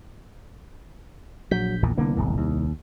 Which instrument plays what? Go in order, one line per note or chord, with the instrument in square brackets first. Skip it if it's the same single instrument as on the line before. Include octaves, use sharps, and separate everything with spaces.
[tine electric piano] A#1 G6 B6 [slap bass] F#3
[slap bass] A#1 E2 A#2
[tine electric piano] C2 [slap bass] D3 A#3 B3
[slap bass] D1 G#1 E2
D#2